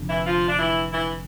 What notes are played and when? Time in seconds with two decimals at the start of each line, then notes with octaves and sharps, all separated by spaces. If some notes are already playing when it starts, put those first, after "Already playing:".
Already playing: F1 F2 D3
0.09 E3 E4
0.26 F3 F4
0.48 D4
0.59 E3 E4
0.92 E3 E4